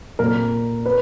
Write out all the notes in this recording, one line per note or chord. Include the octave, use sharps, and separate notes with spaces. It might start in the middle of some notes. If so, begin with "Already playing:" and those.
A#2 A#4
B4